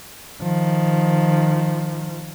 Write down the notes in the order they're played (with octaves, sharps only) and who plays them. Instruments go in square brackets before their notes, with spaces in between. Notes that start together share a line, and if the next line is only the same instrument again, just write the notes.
[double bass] D#3 F3